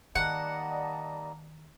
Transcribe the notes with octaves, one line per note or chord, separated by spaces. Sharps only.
D#3 G3 A#3 D#4 D5 D#5 F#5 A5